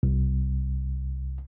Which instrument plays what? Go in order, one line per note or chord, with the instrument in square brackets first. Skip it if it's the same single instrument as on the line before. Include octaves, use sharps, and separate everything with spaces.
[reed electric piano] C2